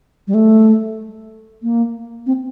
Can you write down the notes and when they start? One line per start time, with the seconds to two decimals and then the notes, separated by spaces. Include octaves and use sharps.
0.27 G3
0.34 A3
1.63 A#3
2.26 C4